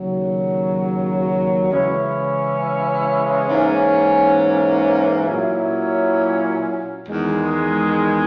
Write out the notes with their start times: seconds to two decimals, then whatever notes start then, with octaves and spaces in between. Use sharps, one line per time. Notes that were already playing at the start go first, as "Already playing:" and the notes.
Already playing: D#2 C#3 F#3
1.69 C#3 E3 G#3 C#4 E4
3.50 G#2 E3 A#3 C#4
5.28 A#2 F#3 C#4 E4
7.08 E2 D#3 G#3